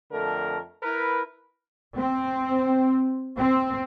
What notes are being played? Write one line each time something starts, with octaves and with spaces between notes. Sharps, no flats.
F2 D3 A3 A#4
E4 A#4 B4
C4
C4